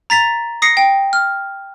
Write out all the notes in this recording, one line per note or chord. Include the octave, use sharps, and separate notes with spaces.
A#5 A6 B6 F7
D#6 A#6 C7 C#7
G5
F6